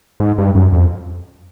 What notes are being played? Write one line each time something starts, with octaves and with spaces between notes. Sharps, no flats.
G#2
G2
F#2
F2